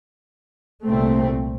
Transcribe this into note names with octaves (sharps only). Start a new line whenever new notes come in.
C2 A#2 A3 C4